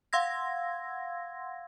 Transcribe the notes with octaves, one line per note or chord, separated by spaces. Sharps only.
F5 F#5 C6 E6 G#6 A#6